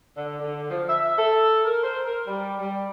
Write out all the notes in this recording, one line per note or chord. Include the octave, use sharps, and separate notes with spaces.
D3
D3
F3
E5
A4
A#4
C5
A#4
G3
G3